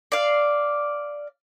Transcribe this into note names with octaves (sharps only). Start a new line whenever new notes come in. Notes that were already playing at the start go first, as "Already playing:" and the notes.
D5 F5